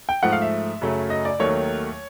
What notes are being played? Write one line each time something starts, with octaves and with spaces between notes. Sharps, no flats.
G5
G#2 F3 A3 F#5
F5
E5
F#2 C#3 F#3 A3
D#5
D5
D#2 D#3 F#3 A3 C#5